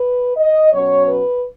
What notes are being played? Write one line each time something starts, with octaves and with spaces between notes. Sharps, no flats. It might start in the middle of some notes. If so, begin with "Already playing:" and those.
Already playing: B4
D#5
B2 F#3 C#4 C#5
B4